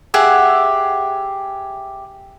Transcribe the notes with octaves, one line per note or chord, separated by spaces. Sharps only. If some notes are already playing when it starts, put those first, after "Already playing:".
G4 G#4 E5 F#5